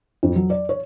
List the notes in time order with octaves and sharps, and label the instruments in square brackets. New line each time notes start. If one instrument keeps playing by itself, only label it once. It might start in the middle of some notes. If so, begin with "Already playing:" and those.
[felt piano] F2
F#3
D5
C#5